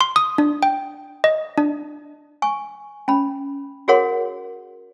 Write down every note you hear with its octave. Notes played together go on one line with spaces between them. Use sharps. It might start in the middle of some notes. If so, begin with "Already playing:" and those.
C6
D#6
D4
G5
D#5
D4
G#5 C#6
C#4 B5
F#4 G#4 A#4 C#5 F#5 C6